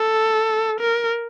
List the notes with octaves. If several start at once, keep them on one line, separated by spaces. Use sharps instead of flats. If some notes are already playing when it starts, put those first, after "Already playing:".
Already playing: A4
A#4